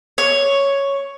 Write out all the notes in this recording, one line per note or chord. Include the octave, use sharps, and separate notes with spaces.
C#5